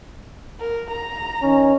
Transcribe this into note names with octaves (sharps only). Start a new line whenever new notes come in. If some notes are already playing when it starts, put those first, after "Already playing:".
A#4
A#5
D#3 C#4